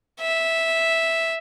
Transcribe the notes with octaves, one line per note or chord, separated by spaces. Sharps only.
E5